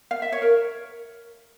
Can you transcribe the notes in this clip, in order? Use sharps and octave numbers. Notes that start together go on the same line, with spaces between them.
F5
E5
C#5
A#4